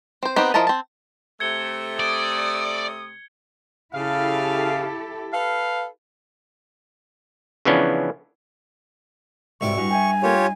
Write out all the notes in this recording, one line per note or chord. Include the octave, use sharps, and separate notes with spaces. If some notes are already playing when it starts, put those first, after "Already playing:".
C4 C5
B3 C4 D#4 G4
F3 E4 A#4 D#5 A5
C4 A5
C3 A3 G#6 C#7 G7
D5 D#6
C#3 E4 G4 A4 F5
A4 B4 F5
C#3 E3 F3 B3 C#4 D4
B1 G#2 C3 G3 E4 D5 C#6
G2 E4 F#4 G#5
E5 G5 G#5
A#3 F4 G4 A4 A#4 C#5
D#4